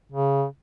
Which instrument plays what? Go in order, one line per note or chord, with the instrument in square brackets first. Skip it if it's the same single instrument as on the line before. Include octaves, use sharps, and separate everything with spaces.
[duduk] C#3